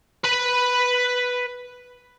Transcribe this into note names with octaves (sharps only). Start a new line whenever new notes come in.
B4 B5